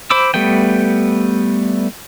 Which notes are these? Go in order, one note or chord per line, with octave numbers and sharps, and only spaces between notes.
C5 B5 D6 E6
G3 A3 B3 G5